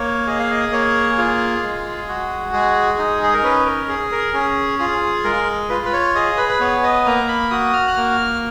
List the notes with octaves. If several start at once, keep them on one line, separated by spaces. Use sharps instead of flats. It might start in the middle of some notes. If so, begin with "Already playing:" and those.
Already playing: A#3 C#5
G#4 D#5
F5
D#5
A#3 C#5
F4 G#4
G#3
F#4
G#3 G#4
D#4
G#4
A#4
C#4 B4
A#4
G#4
A#4
C#4 G#4
F4 G#4
G#3 A#4
F4 B4
B4
C#5
G#4 D#5
B4
B4
B3 C#5
D#5
A#3 A#5
B5
F#4 D#6
F6
F#6
A#3 F6